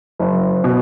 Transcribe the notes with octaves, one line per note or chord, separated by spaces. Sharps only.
F#1
B2